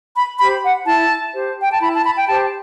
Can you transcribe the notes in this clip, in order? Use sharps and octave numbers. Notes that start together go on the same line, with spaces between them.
B5
G4 C5 B5
F#5
E4 A5
G4 C5
G5
A5
E4 B5
A5
B5
G5
G4 C5 A5